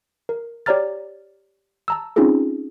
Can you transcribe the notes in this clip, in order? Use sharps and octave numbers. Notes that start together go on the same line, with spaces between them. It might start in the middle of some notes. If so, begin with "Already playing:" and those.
A#4
G4 C#5 D5 A#5 F6 A6
A5 A#5 E6
C4 C#4 D#4 F4 G#4 A4